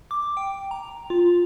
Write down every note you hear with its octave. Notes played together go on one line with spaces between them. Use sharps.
D6
G5
A#5
F4